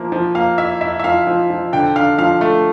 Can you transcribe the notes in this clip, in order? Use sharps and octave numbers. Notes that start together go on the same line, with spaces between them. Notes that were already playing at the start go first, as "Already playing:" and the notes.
Already playing: F3 A#3 E4
F3
A#3 F5
E4 E5
E4 E5
E5
F3 F5
F3
F3
D3 G5
D3 F5
F3 F5
A3